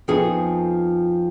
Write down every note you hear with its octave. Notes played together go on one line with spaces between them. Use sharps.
F2 F3 B3 D#4 G#4